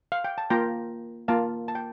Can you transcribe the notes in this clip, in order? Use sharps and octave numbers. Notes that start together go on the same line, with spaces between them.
F5
G5
A5
A#3 F4 G5 A#5
A#3 F4 F5 A5
A5
G5